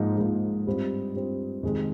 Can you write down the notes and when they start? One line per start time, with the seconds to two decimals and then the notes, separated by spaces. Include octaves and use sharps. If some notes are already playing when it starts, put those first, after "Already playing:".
Already playing: G#2 F3 A#3 D#4
0.18 G#2 F3 A#3 D#4
0.67 G2 G3 C4 F4
1.15 G2 G3 C4 F4
1.63 F2 C3 D#3 G#3